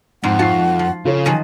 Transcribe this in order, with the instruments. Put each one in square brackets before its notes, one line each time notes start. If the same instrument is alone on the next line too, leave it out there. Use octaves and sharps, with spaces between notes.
[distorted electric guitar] F2 [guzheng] G#2 [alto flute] F#5
[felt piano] F4 C7 [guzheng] F#4 C#5 A5
[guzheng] F3
[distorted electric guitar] C#3 [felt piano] F4 A4 C#5
[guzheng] D#3 F3 F#3 [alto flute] G#5 [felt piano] D#7